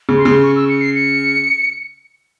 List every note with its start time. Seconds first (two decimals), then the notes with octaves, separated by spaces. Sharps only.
0.09 C#3
0.17 C6
0.25 C#3
0.43 C#6
0.56 E6
0.69 C#7
0.81 C7
0.95 C#7